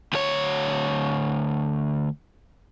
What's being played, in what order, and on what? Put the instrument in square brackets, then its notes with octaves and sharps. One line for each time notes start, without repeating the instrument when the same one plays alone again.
[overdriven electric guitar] D2 C#5